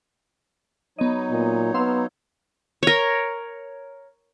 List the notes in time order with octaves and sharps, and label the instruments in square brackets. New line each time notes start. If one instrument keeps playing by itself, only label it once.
[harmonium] F#3 D#4 C#5 [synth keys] B3 D#5
[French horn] A#2
[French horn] B3 [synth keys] F5 C6 E6
[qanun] A#4 C#5